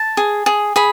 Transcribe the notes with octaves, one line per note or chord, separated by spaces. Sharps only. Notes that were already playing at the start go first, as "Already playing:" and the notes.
Already playing: A5
G#4
G#4
G#4 B5